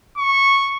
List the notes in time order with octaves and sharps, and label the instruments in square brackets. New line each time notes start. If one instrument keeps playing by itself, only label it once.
[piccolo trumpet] C#6